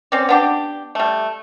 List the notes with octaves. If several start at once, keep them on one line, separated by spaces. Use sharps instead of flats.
C4 C#4 D5
B3 D4 G4
G3 A3